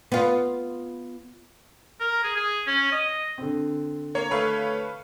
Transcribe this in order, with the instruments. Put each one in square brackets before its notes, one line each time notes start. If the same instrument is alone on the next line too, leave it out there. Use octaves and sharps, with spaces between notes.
[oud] B3 F4
[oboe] A#4
G#4
G#4
C#4
D#5
[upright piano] D3 C4
[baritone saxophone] A#3 [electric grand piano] C#5
[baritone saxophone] A3 [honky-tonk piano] B4 F5 C#6